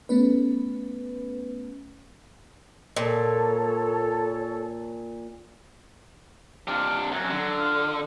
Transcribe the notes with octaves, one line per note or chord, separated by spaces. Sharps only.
A3 B3 C#4 B4
A#2 A4 C#5
C3 D4 F4
F#2 F#3
D3
F4